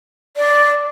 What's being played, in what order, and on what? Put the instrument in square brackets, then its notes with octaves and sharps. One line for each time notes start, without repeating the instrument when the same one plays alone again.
[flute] D5